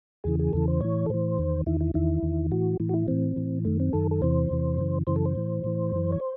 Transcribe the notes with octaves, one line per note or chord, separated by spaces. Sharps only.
E2 C#3 E3 G#4
G#4
E2 C#3 E3 A4
C5
A2 E3 C#5
A4
A2 E3 C5
E2 D#3
E2 D#3 E4
E4
E2 D#3 E4
E2 D#3
A2 E3 F#4
A2 E3
F#4
E4
A2 E3 C4
A2 E3
F#2 D#3 A3
C4
F#2 D#3 A4
A4
E2 C3 E3 C5
E2 C3 E3
F#2 C#3 E3
F#2 C#3 E3 C5
A4
C5
A2 E3
A2 E3
F#2 E3
C#5
C5